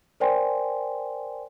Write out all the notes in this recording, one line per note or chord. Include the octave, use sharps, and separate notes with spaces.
A#4 C5 D5 G5 G#5 C6